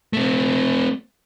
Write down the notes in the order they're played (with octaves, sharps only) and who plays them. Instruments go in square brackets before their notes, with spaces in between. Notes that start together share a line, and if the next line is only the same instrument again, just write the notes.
[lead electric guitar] A3 C4